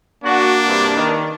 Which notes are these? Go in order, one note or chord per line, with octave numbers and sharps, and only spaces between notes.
A#3 D4 F#4
G2 C3
D#3